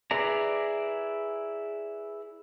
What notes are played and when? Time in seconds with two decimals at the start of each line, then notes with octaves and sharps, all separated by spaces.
0.11 E4 G#4 B4 D5 A#5